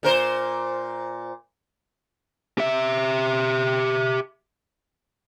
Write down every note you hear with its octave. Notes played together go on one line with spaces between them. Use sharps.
A#2 A#4 C5
G4 E5